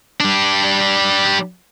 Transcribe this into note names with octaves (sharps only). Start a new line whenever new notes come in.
G3 D4